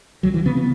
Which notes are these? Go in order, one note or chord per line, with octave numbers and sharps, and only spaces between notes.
C#2 F#3
E3
C#3 B3
B3